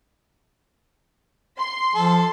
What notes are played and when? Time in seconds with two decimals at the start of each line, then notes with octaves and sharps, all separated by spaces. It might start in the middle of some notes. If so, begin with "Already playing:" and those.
1.58 C6
1.95 F3 A4